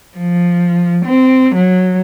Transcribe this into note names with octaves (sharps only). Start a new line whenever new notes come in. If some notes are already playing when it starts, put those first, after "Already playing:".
F3
C4
F#3